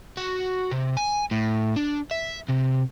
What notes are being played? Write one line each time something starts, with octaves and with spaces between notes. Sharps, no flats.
F#4
C3
G#5
A2
D4
E5
C3